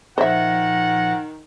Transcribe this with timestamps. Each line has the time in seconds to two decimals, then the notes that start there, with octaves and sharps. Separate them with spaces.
0.18 A#2 D#3 F3 C5 E5 F#5 A#6